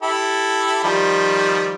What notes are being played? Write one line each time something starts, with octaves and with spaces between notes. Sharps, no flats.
E4 G4 A4
D#3 F3 G3